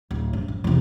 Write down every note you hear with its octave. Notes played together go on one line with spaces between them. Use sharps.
D1
G2
A#1
E2 C3